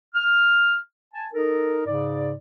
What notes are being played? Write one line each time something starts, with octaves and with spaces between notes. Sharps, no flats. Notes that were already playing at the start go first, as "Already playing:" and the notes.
F6
G#5 A5
D#4 A4 A#4
G#2 C#3 D5